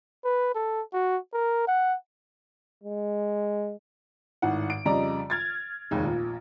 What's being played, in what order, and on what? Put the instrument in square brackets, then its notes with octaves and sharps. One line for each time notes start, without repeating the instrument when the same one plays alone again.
[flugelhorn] B4
A4
F#4
A#4
F#5
[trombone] G#3
[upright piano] G#1 A2 D#3 F#5
D7
F2 C#3 G3 D5 D#5 A#5
F6 G#6 A6
F1 D#2 G#3
A#1 A#2